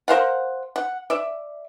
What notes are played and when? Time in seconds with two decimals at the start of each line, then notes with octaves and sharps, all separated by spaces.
0.08 A#4 C5 F5 F#5
0.76 F#5
1.10 D5 E5